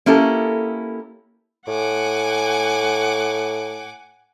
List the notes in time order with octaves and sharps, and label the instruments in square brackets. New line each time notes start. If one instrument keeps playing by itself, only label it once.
[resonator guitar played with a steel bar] A#3 C#4 E4 G4 A4
[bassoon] A2 [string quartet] F#5 G#5 D6